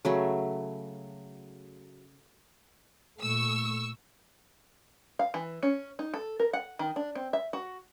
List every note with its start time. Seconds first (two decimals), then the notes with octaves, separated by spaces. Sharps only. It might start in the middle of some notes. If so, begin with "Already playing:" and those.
0.05 C#3 F#3 A3
3.21 A#2 A3 C#6 E6
5.19 F5
5.34 E3
5.63 C#4
5.99 D#4
6.14 A4
6.40 A#4
6.53 F#5
6.79 D#3
6.96 D4
7.15 C4
7.33 E5
7.53 F#4